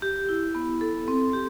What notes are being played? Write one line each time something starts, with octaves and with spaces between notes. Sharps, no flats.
G4
E4
B3
A4
C4
G4